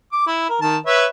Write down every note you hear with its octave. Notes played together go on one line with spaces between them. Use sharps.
D6
E4
A#4
D#3 A5
B4 C#5 E5